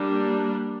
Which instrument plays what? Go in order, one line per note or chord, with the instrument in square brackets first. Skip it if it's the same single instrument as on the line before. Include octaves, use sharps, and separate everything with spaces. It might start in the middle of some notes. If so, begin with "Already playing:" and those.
Already playing: [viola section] G3 A#3 D4